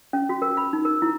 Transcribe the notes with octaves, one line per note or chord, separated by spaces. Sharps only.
C#4
F#4
A#4
B5
D#4
A#4
E4